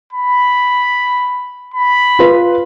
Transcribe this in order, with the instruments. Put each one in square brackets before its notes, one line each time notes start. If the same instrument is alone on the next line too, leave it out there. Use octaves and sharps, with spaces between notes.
[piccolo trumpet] B5
B5
[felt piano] F4 B4